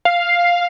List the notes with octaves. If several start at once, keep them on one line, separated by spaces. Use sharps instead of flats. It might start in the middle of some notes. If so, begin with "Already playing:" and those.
F5